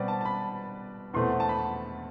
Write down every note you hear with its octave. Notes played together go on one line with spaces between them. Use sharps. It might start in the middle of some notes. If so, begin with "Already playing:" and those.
Already playing: B2 G3 C4 B4 D5
A5
A5
B5
E2 B2 A3 C4 C6
A5
B5